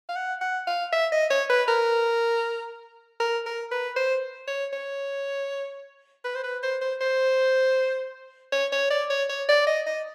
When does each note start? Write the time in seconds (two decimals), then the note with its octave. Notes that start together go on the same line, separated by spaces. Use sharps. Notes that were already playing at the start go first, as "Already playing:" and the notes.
0.09 F5
0.16 F#5
0.41 F#5
0.67 F5
0.92 E5
1.12 D#5
1.30 C#5
1.50 B4
1.68 A#4
3.20 A#4
3.46 A#4
3.72 B4
3.96 C5
4.47 C#5
4.73 C#5
6.25 B4
6.35 C5
6.44 B4
6.63 C5
6.81 C5
7.01 C5
8.52 C#5
8.72 C#5
8.91 D5
9.10 C#5
9.29 C#5
9.49 D5
9.67 D#5
9.86 D#5